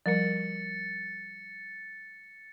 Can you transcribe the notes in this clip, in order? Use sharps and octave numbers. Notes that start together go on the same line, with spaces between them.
F3 G3 A#4 A6 C#7